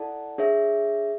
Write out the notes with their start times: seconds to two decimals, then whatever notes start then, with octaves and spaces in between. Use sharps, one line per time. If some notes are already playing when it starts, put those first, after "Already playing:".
Already playing: E4 A4 D5 F#5 A5
0.38 D4 G#4 C#5 E5